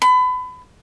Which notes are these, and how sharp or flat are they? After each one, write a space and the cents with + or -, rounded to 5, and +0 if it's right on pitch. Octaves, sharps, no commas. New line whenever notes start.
B5 +30